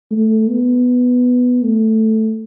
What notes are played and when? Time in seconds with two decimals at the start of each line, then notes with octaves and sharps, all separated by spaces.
0.11 A3
0.48 B3
1.63 A3